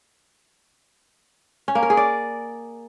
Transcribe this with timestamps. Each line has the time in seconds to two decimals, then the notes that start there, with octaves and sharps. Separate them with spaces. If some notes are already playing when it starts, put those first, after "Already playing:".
1.68 C#4
1.75 A#3
1.83 A#4
1.90 G#4
1.97 D5